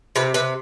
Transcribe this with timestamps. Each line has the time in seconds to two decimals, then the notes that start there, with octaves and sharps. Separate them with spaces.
0.16 C3 B4
0.34 C3 B4